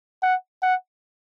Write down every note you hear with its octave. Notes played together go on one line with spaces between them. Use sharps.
F#5
F#5